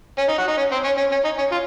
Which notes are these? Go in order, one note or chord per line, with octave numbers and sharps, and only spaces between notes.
C#4
D#4
F#4
D#4
C#4
C4
C#4
C#4
C#4
D#4
C#4
F4